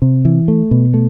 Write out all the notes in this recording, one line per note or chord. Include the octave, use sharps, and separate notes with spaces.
C3
E3
A3
B2
A3